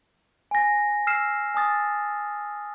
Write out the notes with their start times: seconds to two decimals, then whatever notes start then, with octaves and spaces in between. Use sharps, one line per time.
0.51 G#5 A#6
1.07 E6 F6 C7 E7
1.54 G#5 A5 D#6 A6